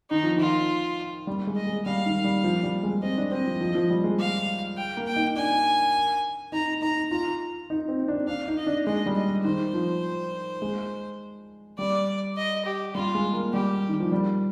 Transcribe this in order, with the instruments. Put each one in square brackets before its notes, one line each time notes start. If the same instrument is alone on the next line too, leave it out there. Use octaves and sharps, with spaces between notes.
[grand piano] D#3 [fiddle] D#4
[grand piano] F3
[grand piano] D#3 [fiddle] F4
[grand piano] G3
G#3
[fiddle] D#5
[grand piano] G#3
[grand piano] G3 [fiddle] F5
[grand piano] D#3
G3
F3
G3
G#3
[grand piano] C4 [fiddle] D#5
[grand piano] D4
[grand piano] C4 [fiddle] D#5
[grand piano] F3
F3
F3
G3
G#3
[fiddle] F5
G5
[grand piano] A#3
[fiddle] G5
[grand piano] D#4
[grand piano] D4 [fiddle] G#5
[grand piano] D#4 [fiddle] A#5
[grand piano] D#4 [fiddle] A#5
[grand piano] F4 [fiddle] A#5
[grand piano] D#4
C4
D4
[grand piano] D4 [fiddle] F5
[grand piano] D#4
[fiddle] D#5
[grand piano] D4
[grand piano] G#3 [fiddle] D#5
[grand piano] G3
[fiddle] D#5
[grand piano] D#3 [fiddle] C5
[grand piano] F3
G#3
[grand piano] G3 [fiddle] D5
[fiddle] D#5
G4
[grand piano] G3 [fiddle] F4
[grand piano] G#3
A#3
[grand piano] G3 [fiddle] G4
[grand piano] D#3
F3
G3